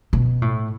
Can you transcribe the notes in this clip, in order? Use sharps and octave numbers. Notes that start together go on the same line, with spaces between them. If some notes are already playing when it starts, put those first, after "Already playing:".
B2
A2